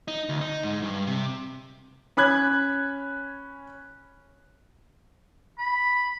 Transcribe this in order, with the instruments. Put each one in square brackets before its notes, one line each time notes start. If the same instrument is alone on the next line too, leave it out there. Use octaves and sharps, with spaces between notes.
[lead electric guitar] D#4
D2
D#4
G#2
G2
C3
[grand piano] C#4 B5 F#6 G#6
[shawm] B5